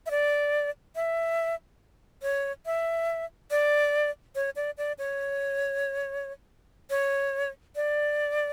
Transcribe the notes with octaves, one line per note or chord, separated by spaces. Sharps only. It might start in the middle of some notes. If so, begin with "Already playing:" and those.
E5
D5
E5
C#5
E5
D5
C#5
D5
D5
C#5
C#5
D5